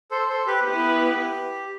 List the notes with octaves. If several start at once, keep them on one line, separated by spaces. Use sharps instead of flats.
A4 C5
A4 C5
G4 B4
B3 E4 G4 B4